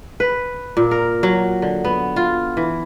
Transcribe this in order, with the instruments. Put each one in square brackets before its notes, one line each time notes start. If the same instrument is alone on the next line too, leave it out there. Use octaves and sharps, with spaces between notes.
[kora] B4
A#2
A#4
F#3
D3
B3
F4
E3